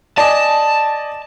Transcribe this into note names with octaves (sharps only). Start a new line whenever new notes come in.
D5 D#5 G#5 A5